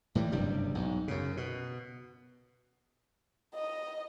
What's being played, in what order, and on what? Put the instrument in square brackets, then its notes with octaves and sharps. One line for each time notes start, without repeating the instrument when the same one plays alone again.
[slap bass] A2 E3 G3
F#1 G2 C3 G3
B1 G#2
F#2 C#3
B2
[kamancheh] D#5